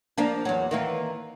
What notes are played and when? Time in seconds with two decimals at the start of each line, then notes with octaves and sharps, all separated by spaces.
0.18 F3 A#3 D4
0.45 E2 F#3
0.71 D#3 E3 A#3